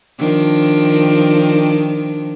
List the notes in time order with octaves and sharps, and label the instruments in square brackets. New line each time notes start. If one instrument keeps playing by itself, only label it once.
[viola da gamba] D#3 F3 D4